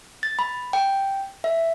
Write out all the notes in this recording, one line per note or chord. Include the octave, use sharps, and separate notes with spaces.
A6
B5
G5
E5